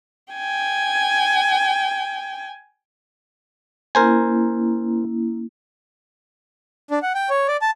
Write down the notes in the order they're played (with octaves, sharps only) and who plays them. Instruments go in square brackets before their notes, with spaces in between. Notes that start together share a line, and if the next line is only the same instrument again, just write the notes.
[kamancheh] G5 G#5
[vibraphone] A#3 C#4 E4 [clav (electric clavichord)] A#4 C5 G#5
[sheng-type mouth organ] D4
F#5
G5
C#5
D5
A5